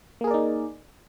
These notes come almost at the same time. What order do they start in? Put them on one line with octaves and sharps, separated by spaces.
A#3 G#4 A#4 D5 D#4